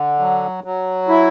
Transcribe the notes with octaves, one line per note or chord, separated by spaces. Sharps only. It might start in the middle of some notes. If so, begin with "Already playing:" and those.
Already playing: D3
F#3
F#3
E4